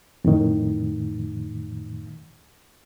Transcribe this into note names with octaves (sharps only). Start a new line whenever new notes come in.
F2 A2 D#3